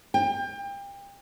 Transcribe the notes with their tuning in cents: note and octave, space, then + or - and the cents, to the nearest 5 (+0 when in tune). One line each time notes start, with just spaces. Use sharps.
G5 +30